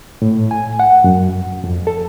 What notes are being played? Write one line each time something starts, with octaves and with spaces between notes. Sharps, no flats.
A2
G#5
F#5
F#2
F2
A4